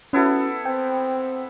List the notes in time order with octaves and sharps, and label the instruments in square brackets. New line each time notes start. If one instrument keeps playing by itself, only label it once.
[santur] B3 E4 A4 [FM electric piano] C#4 F#4
[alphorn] C4 [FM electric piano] G5